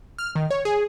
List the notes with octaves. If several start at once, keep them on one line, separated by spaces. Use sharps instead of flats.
F6
D#3
C#5
G#4